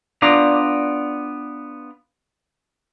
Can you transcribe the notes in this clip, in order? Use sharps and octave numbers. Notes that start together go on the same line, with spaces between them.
B3 D4 F4 D5 A#5